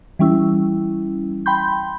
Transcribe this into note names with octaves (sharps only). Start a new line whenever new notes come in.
E3 G3 C#4 E4
G5 B5 C6 G6